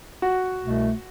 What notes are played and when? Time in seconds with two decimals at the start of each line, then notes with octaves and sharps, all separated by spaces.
0.22 F#4
0.62 C2 B2 A3